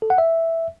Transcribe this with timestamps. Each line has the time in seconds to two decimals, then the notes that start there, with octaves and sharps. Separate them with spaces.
0.02 A4
0.10 F#5
0.18 E5